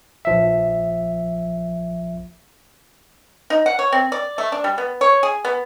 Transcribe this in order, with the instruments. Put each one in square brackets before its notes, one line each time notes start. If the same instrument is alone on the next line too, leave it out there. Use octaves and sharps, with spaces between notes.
[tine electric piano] A#1 F3 E5
[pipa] D#4
F#5
C#5
C4
D5
A3
D4
G3
B3
C#5
G#4
B3